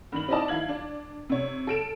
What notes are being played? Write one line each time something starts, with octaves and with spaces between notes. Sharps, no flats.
G2 D#3 F#7
C4 D#4 E4 D5 D#5 A5
D#3 E4 F5 G#6 F#7
D4
C3 C#5
A4 D7 E7